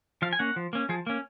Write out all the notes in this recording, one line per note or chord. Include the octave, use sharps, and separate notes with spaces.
F3 F5
G#5
A#3 C#4 F#5
F3
A#3 C#4
F3 G#4
A#3 C#4